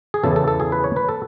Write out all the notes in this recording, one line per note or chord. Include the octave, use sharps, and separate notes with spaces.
G#4
E2 C#3 E3 A4
A4
A4
G#4
B4
C#5
B4
A4